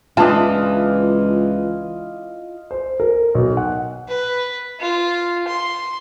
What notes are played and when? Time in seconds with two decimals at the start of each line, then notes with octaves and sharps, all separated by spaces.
0.17 C#2 E3 D4 F4 D#5 A5
2.71 C5
3.00 A#4
3.35 B1
3.57 F#5
4.08 B4
4.80 F4
5.48 C6